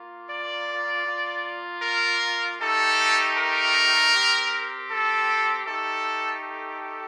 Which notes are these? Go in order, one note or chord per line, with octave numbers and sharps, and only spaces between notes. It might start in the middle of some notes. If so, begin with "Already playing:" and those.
Already playing: A#3 F4
D5
A#3 F4
A#4
A3 D#4 G4 A4
A#4
C4 G4
A4
A3 D#4 G4 A4
A4